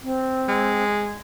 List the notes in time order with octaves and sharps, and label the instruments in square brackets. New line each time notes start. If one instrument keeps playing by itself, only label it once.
[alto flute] C4
[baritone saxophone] G#3